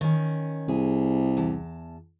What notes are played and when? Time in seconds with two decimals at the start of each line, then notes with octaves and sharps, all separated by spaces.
0.01 D#3 C#4
0.68 C2 G#4
1.37 E2 A5